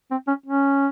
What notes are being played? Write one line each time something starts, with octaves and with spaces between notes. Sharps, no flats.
C4
C#4
C#4